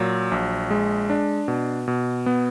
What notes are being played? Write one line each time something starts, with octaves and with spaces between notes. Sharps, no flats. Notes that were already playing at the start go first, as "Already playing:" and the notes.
Already playing: A#2 F#3
A#1
G#3
D4
B2
B2
B3